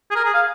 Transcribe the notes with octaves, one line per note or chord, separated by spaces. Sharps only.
G#4
A#4
G#4
F5